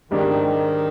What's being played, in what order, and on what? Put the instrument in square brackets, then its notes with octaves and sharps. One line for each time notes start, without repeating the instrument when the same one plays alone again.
[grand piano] G#2 G3 D4 G4 [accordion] D#3